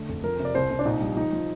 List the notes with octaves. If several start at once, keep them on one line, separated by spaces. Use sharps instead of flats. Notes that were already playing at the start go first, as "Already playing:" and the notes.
Already playing: D3 A3
F1
F3 A#4
C3
D5
C2 C5
C2
D4
A#1 D#4
G3
F3 D#4
F3